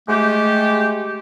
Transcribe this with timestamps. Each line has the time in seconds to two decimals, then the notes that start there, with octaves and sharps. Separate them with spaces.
0.08 G#3 A3 G4